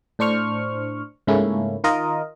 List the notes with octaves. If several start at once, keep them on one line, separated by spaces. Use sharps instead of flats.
A2 D4 C5 C#6 F6
G#2 C#3 A3 A#3 C#4 E4
D#3 F4 A#4 D#5